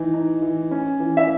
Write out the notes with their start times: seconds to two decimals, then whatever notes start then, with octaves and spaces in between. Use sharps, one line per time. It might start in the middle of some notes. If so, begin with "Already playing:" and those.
Already playing: E3 D#4
0.14 D#4
0.42 E3
0.71 C#4
1.00 E3
1.17 E5